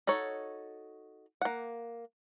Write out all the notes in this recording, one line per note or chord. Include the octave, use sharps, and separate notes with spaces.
D#4 F#4 A4 C#5
A#3 F#5